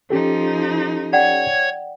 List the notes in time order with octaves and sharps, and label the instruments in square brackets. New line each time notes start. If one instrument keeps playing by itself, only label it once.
[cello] F3 D#4 [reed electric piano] C#4 G4 A4
[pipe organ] C#5 G#6 [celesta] D5 F#5 G5